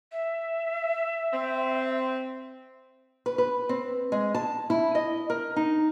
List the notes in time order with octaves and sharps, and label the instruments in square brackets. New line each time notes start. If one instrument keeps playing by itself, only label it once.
[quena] E5
[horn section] C4
[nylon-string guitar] B4
B4
C4
G#3
A5
E4
D#5
A#4
D#4